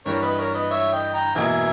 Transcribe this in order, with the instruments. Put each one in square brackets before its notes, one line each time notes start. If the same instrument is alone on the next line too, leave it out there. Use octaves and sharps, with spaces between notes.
[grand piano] G2 E3 G3 [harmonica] A#4 C#5
[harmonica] B4 D#5
A#4 C#5
B4 D#5
C#5 E5
D#5 G5
G5 A#5
[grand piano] E1 E2 B2 A#3 [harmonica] E5 G#5